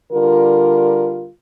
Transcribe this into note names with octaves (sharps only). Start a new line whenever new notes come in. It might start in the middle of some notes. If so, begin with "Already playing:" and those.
D3 G3 F4 A#4